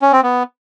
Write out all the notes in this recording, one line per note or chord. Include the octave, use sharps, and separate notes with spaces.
C#4
C4
B3